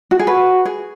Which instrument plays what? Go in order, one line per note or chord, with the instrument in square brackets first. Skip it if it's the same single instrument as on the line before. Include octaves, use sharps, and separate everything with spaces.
[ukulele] F#4
G#4
[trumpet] F#4 [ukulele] B4
[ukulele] G#4